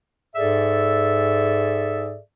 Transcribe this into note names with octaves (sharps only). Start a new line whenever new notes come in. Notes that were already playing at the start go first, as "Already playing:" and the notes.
G#2 G#4 A4 D5 E5